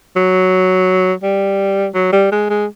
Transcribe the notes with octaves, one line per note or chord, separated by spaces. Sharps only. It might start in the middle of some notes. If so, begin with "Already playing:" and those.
F#3
G3
F#3
G3
G#3
G#3